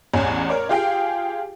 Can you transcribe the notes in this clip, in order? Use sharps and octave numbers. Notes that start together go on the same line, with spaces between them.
A1 E2 C#5 G#5
A#4 C#5 D5
F4 G4 G#4 F5 G5